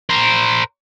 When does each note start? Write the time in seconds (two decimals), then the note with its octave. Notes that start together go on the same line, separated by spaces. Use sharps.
0.09 A#4 C5